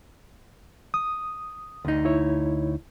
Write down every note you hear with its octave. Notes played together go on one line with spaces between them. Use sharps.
D#6
D2 D#4
E4 C#5